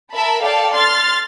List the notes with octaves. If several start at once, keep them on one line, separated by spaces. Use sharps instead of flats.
A#4 E5 A5 B5
A4 D5 F5 G5 A5
C6 F6 A6